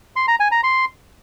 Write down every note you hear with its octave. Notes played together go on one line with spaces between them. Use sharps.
C6
A#5
G#5
A#5
C6